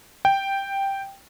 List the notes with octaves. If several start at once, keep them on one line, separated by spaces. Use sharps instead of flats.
G5